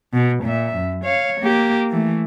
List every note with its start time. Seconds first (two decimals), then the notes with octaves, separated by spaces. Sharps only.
0.14 B2
0.43 A#2 E5
0.75 F#2
1.05 C#5 F5
1.41 A#3 G4
1.90 E3 A3